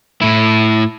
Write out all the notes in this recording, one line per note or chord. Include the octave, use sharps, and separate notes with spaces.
A2 E4